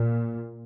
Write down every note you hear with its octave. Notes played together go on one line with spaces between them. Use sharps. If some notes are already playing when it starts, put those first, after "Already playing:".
Already playing: A#2